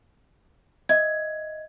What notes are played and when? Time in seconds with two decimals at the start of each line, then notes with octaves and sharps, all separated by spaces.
0.89 D#5 E5 G#6